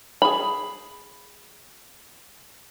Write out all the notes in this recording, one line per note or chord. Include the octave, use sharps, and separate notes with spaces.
G#4 B5